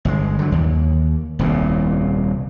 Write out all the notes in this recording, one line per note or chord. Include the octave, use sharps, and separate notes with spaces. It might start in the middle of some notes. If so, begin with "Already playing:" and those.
G1 B2 G#3
D3 F#3
D#2
D#1 C2 A#2